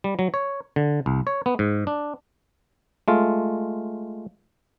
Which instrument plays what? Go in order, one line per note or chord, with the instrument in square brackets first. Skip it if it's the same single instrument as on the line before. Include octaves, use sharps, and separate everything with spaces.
[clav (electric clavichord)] G3
F#3
C#5
D3
C2
C#5
B3
G#2
D4
G#3 A3 F4